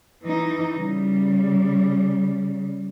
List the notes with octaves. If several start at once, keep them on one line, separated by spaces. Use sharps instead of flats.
E3 D#4
C#3 G3